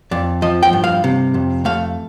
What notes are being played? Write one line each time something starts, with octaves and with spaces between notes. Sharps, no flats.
F2 D5
F3 D#5
G5
G2
F5
C3
F2
A3 F5